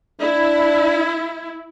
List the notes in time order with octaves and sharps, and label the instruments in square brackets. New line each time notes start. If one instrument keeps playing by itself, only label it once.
[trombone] D4 [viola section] E4